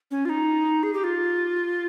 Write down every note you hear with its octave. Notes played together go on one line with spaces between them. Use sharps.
C#4
F4
D#4
G#4
G4
F4